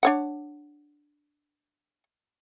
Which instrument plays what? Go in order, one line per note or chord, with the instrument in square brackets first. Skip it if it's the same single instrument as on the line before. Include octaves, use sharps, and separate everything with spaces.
[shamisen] D4 C#5 F#5